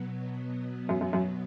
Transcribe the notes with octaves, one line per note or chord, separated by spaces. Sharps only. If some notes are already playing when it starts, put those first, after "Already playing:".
Already playing: B2 F#3 B3
F#2
F#2
F#2